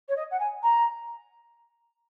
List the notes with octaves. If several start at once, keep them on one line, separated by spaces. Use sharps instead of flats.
C#5
D#5
F#5
G#5
A#5